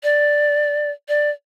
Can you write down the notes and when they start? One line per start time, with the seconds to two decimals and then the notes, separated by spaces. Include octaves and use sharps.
0.03 D5
1.08 D5